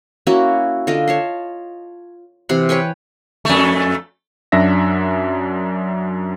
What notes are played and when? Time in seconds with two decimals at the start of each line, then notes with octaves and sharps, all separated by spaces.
0.27 A#3 C#4 E4 F#4
0.87 D3 F4 D#5
1.08 C#5 A5 C6
2.49 C3 E3 F#5 C6
2.69 B4 C#5 G5 G#5
3.45 F2 A3
4.52 F#2 F#3 D4 E5 A#6